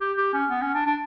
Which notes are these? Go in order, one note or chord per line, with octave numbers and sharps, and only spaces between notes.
G4
G4
C#4
B3
C#4
D4
D4